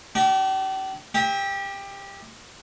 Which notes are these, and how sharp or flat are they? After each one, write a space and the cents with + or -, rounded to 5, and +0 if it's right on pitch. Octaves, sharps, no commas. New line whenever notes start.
D4 +0 G4 -40
G4 +20 E5 -35